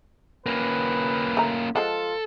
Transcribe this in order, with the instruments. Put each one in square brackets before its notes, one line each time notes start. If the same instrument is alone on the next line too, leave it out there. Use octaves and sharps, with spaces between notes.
[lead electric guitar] A#3 C#4 [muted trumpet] B4
[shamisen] A3 A#5
[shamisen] F3 G#3 F#5 [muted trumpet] F4 [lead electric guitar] A4